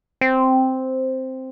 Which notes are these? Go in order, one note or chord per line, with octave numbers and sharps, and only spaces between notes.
C4